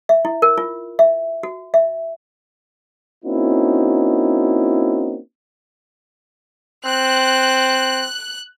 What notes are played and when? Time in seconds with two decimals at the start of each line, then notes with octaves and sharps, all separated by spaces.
0.09 E5
0.25 E4
0.42 A#4
0.58 F4
0.99 E5
1.43 F#4
1.74 E5
3.25 A#3 C4 C#4 D#4 E4 F#4
6.85 C4 F#6